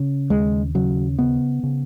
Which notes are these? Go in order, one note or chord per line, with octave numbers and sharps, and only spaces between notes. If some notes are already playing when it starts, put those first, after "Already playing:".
Already playing: C#3
D#2 G#3
C#3 F#3
C#3 B3
C#3